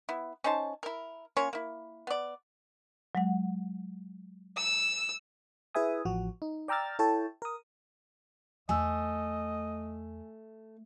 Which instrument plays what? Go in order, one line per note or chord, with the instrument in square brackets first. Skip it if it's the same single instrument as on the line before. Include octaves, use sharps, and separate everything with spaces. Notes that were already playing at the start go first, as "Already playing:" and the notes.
[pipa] B3 E4
C#4 D#4 C5 A5
E4 A#4
A#3 C#4 F4 C#5
A#3 E4
B3 D5
[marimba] F#3 G#3 F#5
[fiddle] E6
[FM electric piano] E4 G#4 B4 E5 G#5 D#6
A1 F3 F#4
D#4
D5 G5 A#5 E6 F6 A6
E4 A4 C#5 G5 A5
A#4 D#6
[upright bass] E2 D#4 [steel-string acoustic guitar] A3 [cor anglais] D#5 [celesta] G#5 E6